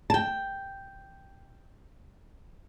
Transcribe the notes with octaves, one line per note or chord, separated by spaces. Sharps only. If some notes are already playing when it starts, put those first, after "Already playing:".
G5 A5